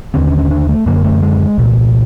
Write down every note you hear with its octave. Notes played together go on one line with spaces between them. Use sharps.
D#2 D3 C4
C#4
C#4
D4
A3
F#2 D3 A#3
A3
G#3
C2 A#2